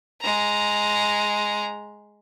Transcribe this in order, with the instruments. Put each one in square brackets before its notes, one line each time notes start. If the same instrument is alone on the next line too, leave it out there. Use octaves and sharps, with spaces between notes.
[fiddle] G#3 A#5